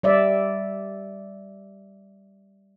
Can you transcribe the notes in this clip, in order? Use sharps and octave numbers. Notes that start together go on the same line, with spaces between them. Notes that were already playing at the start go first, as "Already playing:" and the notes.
G3 D5 E5